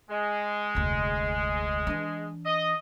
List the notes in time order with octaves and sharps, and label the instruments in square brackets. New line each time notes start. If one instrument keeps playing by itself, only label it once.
[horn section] G#3
[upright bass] F1 D2
E3 D4
[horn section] D#5